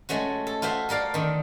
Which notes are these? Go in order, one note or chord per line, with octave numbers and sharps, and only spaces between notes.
G#3 A3 C#4 F#4
A4
F4 F#4 C5 E5
A4 A#4 D5 F5
D3 D#3